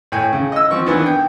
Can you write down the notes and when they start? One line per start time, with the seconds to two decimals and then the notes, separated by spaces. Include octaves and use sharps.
0.12 A2 G5 G#5
0.33 C#3
0.52 D#5 E6
0.71 F3 C4 C#6
0.86 D#3 E3 B3 D4
1.06 G5